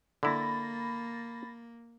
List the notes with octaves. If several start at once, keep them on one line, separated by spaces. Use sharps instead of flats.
D3 A#3 E4 B5 A6 A#6